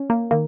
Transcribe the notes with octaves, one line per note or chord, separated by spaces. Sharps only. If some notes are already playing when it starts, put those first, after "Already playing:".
Already playing: C#4
A#3
D#3 A#3